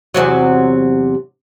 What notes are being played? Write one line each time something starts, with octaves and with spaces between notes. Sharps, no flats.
E2 C3 F#3